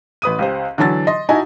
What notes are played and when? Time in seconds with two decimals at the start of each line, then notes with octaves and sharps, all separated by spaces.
0.22 A1 B4 D#6 D#7
0.39 C#2 G4 C5
0.78 D3 E3 F#3 A5 A6
1.07 D#5 C6
1.29 D#4 E4 F#4 D#5 G#5 A5